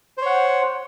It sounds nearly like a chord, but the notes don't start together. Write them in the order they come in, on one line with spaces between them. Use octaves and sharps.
C5 C#5 F#5